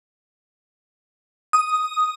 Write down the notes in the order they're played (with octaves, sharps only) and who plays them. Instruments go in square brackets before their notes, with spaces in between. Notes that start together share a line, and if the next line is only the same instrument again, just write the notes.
[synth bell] D#6